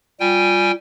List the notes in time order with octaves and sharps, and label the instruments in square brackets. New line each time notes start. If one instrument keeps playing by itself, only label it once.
[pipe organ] G3 G5 G#5 [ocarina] F4